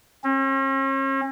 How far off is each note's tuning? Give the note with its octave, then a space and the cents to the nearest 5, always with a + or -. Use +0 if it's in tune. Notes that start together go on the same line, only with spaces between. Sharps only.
C#4 -45